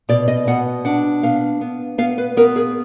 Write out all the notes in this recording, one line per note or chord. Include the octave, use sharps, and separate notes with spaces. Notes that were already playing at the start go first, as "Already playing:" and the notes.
B2 D5
D#5
B2 F#5
D4 F#5
B3 F5
B3
B3 F5
B4
B3 A#4
G#4